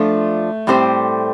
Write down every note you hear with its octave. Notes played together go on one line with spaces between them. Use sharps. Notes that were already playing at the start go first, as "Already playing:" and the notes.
Already playing: F3 A3 D4 F4
A2 G3 C4 G4 C5